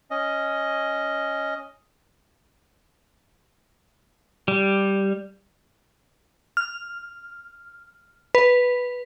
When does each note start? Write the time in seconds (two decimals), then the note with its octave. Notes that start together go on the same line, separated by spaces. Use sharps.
0.11 C#4 D#5
4.48 G3
6.57 F6
8.35 B4